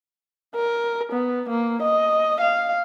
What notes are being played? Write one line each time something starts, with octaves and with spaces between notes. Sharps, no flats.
A#4
B3
A#3
D#5
F5